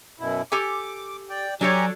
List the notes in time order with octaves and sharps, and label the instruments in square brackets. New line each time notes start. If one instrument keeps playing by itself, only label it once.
[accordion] F#2 B2 E4
[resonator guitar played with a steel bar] G4 A4 G#5 [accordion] D6
[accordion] D5 G5
[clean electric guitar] F#3 [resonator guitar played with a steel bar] D4 A4 C#5 [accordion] G4 G#5 A#5